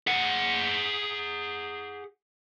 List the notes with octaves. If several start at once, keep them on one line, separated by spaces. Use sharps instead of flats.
G#4 F#5